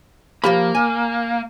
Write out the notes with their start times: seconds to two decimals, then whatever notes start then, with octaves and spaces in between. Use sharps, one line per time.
0.44 F3 A#3 G4 B5
0.75 G#5